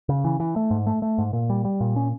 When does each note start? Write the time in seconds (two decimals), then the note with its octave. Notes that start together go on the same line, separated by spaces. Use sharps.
0.09 C#3
0.24 E3
0.40 E3
0.56 A3
0.71 G#2
0.87 A3
1.02 A3
1.18 G#2
1.33 A#2
1.50 G3
1.65 G3
1.81 A#2
1.96 C#4